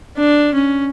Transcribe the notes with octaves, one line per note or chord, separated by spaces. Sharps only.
D4
C#4